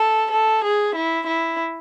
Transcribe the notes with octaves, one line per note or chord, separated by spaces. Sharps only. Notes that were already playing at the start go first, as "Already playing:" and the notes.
Already playing: A4
A4
G#4
E4
E4